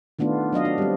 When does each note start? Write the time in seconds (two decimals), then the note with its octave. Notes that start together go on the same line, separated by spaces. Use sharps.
0.19 D#3 A3 B3 D4 F4
0.53 F#3 D4 D#5 F5
0.65 D4
0.78 G3 C4